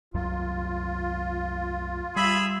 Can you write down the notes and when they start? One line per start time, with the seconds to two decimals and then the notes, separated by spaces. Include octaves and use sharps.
0.14 C2 F#2 F#3 F4
2.16 G3 G#4 E5 B5